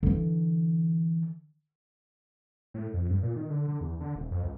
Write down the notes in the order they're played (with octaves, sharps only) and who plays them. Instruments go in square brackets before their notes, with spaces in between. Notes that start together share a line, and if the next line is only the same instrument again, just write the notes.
[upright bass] D3 E3
[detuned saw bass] A2
F2
G2
A#2
D#3
D3
D3
E2
D3
D#1
F2
C#2